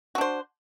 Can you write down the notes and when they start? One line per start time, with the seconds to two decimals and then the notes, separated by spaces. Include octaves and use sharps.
0.15 F#4
0.18 D4
0.21 C5